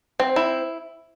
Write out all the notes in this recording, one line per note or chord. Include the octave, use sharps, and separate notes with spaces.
C4
E4